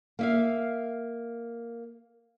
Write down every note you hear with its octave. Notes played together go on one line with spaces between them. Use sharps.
A#3 E5 F5